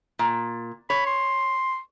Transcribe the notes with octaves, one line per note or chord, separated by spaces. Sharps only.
A#2
C#5 B5
C6